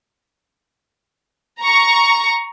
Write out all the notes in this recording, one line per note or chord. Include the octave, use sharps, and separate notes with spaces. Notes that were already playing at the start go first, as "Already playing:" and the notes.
A#5 C#6